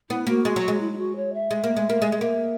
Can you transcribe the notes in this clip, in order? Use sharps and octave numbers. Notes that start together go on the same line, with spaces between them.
B3 E4
A#3 F#4
G#3
F#3
G#3
E4
E4
F#4
C#5
E5
G#3
A#3
G#3
A#3
G#3
G#3
A#3 E5